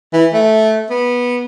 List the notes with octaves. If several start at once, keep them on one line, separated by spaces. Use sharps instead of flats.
E3
A3
B3